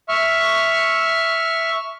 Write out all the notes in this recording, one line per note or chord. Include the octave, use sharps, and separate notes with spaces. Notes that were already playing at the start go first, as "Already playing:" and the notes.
E5 C#6 F6